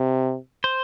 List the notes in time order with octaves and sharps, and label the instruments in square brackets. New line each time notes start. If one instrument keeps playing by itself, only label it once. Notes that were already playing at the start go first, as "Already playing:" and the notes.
Already playing: [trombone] C3
[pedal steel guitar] C5